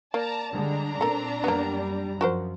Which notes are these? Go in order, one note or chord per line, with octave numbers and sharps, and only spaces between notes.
A#3 D5 A5 A#5
D3 G3 G#3 D4 A#5
A#2 C4 A4 A#4
F#2 G3 A#3 B3
F#2 F3 F#4 A#4 C5